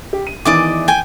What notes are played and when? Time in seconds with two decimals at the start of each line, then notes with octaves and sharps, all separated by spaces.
0.13 G4
0.27 D#7
0.45 E2 D#3 E3 D5 D#5 D6
0.88 G5 G#5